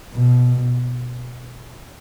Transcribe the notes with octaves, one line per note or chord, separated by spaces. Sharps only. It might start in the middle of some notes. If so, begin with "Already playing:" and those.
B2